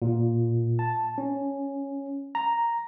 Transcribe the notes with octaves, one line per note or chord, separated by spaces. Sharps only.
A#2
A5
C#4
A#5